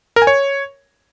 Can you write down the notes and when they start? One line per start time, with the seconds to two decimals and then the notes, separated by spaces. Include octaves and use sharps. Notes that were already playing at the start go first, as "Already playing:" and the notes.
0.16 A#4
0.22 G#5
0.27 C#5